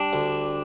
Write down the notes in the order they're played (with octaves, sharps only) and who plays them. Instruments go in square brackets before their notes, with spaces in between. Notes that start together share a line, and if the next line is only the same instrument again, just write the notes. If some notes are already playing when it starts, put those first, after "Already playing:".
Already playing: [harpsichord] G3 [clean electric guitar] D4
[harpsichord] D2